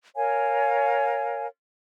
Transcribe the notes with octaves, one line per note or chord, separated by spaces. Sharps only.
A#4 C#5 F5 G#5